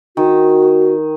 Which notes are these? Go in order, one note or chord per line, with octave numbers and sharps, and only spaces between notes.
D#3 F#4